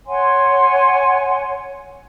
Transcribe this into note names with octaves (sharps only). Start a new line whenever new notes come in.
C#5 F#5 G#5 C6